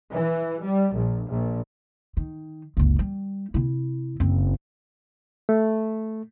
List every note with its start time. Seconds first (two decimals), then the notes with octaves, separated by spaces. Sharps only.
0.11 E3
0.62 G3
0.94 A#1
1.28 A#1
2.17 D#3
2.77 F#1 C#2
2.99 G3
3.54 C3 E4
4.20 F#1 C4
5.49 A3